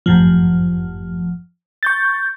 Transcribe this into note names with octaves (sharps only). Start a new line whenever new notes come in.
G1 F#2 A2 F3
C#6 G6 A6